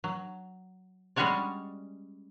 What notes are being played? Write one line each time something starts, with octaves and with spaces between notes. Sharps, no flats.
F#3
G3 G#3 C#4 F#4 C#5 D5